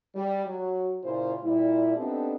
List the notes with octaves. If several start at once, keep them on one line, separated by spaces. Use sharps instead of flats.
G3
F#3 F#4
A#2 C#3 E4 F4 C5
A#2 G3 E4
B3 C4 D4 D#4 G4 A4